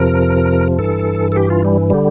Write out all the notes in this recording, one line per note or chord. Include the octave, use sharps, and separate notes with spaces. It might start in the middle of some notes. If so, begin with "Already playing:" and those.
Already playing: F2 C3 F3 A#4
G2 E3 A4
A4
G4
F4
G3
D3 G3